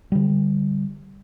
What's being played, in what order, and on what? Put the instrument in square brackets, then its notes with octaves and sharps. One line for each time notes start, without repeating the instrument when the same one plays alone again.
[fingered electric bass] D3 G3